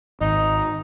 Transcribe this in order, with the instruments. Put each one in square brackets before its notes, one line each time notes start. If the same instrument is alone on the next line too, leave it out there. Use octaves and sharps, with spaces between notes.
[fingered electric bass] G#1 [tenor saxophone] D#4